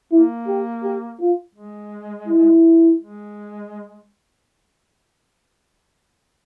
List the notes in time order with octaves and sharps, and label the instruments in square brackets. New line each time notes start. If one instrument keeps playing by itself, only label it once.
[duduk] A#3 [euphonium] E4
[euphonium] G4
G4
F4
[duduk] G#3
[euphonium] E4
[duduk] G#3